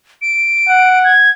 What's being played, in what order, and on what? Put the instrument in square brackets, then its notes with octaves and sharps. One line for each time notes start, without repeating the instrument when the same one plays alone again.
[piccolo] D7
[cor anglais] F#5
[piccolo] G#6